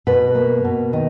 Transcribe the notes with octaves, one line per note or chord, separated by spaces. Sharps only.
B2 B4
A#3
B2
D#3